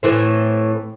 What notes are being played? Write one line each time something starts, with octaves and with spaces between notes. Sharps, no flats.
A2 E3 C4